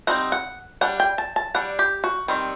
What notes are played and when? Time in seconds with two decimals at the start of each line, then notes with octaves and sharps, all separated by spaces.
0.07 G3 C4 D#4 F#5
0.32 F#5
0.81 G3 D4 F#5
1.00 G5
1.18 A5
1.36 A5
1.54 G3 D4 F#5
1.79 G4
2.04 F#4
2.28 D#3 G3 C4